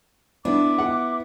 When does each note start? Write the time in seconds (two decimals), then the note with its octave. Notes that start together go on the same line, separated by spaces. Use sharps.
0.45 B3 D4 E4 D6
0.78 F#5